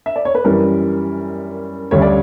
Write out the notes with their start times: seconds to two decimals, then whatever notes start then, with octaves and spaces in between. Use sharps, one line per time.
0.06 E5
0.16 D5
0.25 C#5
0.35 B4
0.44 F#2 E3 G3 A#4
1.91 D2 C#3 G3 C#5
2.02 D5